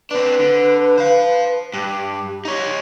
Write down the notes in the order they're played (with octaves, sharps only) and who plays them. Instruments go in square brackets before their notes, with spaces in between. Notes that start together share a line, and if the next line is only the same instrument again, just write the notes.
[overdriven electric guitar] C4 D4 [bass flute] B4
[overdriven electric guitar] D3
C5 F5
[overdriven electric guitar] G2 [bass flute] G4
[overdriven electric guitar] D#4 C#5